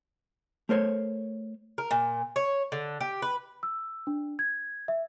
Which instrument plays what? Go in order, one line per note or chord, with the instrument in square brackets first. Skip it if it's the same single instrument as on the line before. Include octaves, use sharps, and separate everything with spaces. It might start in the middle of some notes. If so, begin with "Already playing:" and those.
[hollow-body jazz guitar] A3 A#4 C5 C#5
[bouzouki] A#4
A#2
C#5
D3
G4
B4
[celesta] E6
D4
G#6
E5